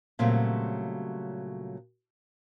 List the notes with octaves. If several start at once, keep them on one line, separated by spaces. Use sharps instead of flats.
A#2 C#3 F#3 G3 A3 C4